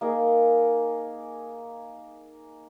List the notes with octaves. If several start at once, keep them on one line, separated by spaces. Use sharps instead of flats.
A#3 D#4 G#4